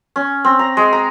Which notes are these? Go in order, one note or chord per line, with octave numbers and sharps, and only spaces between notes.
C#4
C4
A#5
G#3
A#5